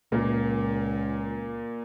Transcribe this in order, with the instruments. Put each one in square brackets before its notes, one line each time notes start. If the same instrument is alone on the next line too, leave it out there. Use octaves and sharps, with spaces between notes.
[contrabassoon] C#2 [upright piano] A#2 A#3